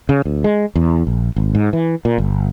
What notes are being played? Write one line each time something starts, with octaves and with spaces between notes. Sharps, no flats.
C#3
D2
G#3
E2
A#1
G#1
G#2
E3
A#2
G1